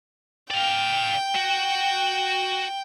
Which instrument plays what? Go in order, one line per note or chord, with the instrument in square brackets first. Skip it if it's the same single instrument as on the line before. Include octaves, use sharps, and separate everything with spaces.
[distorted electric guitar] D5 F5 [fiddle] G5
[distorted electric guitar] F#4